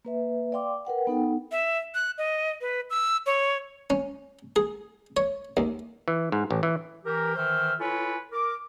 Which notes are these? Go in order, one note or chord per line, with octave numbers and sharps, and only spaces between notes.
A#3 B4 E5
D5 F5 G5 C6 D6
A#4 B4 F#5 G5
B3 D#4 A4 F#5 G5
E5
F#6
D#5
B4
E6
C#5
C#4
G#4
C#5
D#2
E3
G#2
A1
E3
E3 G4 A#4
D#3 E3 C5 E5 F6
E4 F4 A4 B4 C#5 G#5
A#4 D6